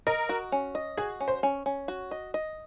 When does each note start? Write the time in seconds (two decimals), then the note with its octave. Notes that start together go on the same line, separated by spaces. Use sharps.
0.07 A#4 D#5
0.29 F#4
0.52 C#4
0.75 D#5
0.97 F#4 G#4
1.20 C#4
1.28 C5
1.43 C#4
1.66 C#4
1.88 F#4
2.11 D#5
2.34 D#5